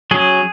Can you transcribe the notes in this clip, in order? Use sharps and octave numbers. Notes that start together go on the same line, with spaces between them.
F#3 C#4 G#4